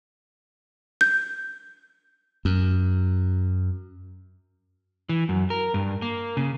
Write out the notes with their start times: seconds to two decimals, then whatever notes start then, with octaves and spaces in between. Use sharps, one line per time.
1.01 G6
2.45 F#2
5.09 E3
5.29 F#2
5.50 A#4
5.74 G2
6.02 A#3
6.37 C#3